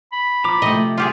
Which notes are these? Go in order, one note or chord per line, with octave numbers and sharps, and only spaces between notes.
B5
F3 A#5 D6
C3 F3 A3 D#5
F4 G4 G#4